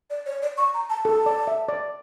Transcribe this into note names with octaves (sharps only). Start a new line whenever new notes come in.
D5
C#5
D5
C#6
A#5
A5
A4 A5
D5
E5
D5